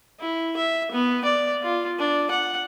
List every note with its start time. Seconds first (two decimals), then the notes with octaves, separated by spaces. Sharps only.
0.20 E4
0.57 E5
0.91 B3
1.24 D5
1.62 F4
1.99 D4
2.31 F#5